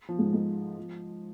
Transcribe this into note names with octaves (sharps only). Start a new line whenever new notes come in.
F3
G#2 G#3
G#2 G#3
F3